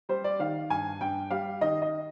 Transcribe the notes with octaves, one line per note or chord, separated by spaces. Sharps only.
G3 C5
D5
D#3 F5
G2 G#5
G2 G5
G3 F5
D#3 D#5
D#5